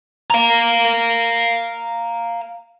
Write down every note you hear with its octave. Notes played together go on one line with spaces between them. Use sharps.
F5 A#5